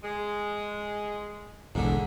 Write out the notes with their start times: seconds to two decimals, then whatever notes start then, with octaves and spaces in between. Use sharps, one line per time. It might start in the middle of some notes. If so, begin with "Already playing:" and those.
0.04 G#3
1.75 E1 A#1 G#2 D3